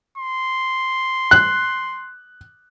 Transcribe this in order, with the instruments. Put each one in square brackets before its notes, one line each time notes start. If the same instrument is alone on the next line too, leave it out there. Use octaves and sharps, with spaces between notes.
[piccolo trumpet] C6
[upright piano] F#6